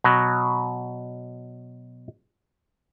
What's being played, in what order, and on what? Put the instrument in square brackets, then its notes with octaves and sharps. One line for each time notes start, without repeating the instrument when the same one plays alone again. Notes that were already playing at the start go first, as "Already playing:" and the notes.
[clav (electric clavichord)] B2 F#3